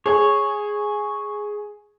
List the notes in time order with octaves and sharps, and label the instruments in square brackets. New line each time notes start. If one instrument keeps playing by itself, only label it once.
[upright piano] G#4 [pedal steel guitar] C#5